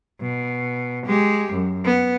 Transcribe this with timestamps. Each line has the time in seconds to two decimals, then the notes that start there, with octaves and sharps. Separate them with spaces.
0.21 B2
1.06 G#3 G4
1.53 F#2
1.85 B3